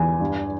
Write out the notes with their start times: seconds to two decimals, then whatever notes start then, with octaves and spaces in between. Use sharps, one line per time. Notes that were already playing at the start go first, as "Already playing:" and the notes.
Already playing: E2 G#5
0.20 G2